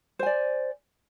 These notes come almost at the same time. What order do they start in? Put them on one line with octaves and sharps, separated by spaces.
C5 G#5 D5